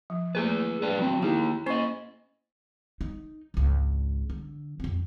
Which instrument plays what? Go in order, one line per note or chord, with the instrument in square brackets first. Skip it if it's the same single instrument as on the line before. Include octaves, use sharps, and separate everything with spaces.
[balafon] F3
[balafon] A3 A#3 [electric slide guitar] G#4 B4
[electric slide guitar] D4 B4
F#3 C4
[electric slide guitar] A#3 D#4 [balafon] E4 G4 G#4
[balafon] A#3 C#4 C#6 [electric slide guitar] C5 D#5
[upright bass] D#4
G#1 C#2
D3
F2 C4